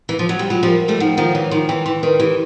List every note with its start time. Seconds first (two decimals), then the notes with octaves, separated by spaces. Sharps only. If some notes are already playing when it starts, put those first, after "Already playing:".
0.09 E3
0.19 F3
0.29 F#3
0.39 G3
0.50 F#3 G#3 F4
0.63 F3 G3 A#4
0.84 G3 A3 A#4
1.00 D#3 F3 F#5
1.17 D#3 F3 F#5
1.35 E3 C#5
1.51 D#3 F3 C6
1.69 E3 G5
1.86 E3 C6
2.03 D#3 B4
2.20 E3 G4